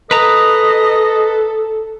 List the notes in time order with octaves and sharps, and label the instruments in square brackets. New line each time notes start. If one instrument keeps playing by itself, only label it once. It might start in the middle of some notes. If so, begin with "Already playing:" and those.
[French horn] A4 [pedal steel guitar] B4 A#5 [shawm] D#5